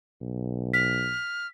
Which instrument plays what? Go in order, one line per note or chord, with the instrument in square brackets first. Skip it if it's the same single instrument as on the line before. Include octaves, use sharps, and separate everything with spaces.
[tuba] B1
[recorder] F6 [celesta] B6